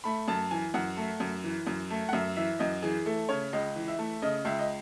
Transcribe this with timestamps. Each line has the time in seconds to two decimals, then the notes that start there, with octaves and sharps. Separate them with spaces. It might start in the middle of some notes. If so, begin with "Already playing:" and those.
0.04 A3 B5
0.28 F#2 A5
0.51 E3 G#5
0.74 F#2 F#5
0.97 A3
1.20 F#2
1.44 E3
1.67 F#2
1.90 A3
2.09 F#5
2.13 F#2 E5
2.36 E3 E5
2.59 F#2 D#5
2.82 E3 G#4
3.06 A3 A4
3.29 C#3 C#5
3.53 C#2 D#5
3.76 E3
3.88 E5
3.99 A3
4.22 C#3 D#5
4.45 C#2 E5
4.59 D#5